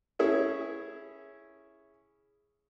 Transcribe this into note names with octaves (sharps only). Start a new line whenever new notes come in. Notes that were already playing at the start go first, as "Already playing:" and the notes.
C#4 E4 G#4